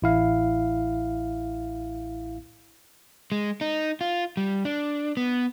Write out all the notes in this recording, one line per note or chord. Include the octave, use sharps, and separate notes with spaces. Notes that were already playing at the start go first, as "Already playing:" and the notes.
A1 E4 F5
G#3
D#4
F4
G3
D4
B3